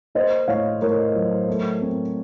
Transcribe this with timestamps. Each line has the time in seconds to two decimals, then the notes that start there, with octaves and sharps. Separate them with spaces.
0.15 A#3 C5 D#5
0.48 A2 C#5 F5
0.82 A2 A#4 C#5
1.15 F#3
1.48 A3
1.81 C4